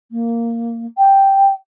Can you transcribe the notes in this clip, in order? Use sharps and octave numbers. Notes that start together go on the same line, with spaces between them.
A#3
G5